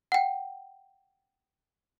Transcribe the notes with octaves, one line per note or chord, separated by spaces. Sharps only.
F#5 G5